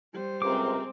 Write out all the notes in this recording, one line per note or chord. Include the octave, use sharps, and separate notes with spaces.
G3 C5
C#2 C3 G#3 C4 A#4 D6